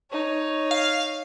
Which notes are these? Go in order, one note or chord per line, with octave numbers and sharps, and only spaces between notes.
D#4 C#5
F5